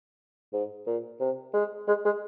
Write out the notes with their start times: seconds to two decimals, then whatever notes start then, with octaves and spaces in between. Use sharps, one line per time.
0.53 G#2
0.86 A#2
1.20 C3
1.54 G#3
1.88 G#3
2.05 G#3